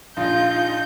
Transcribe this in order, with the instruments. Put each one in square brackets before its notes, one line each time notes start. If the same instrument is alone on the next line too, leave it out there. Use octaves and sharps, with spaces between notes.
[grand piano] A#1 [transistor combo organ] D#4 [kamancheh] F4 [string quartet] G6